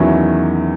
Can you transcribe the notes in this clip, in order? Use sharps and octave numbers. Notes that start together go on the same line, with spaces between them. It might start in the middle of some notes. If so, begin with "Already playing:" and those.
Already playing: E2 D#3 F#3 C#4 E4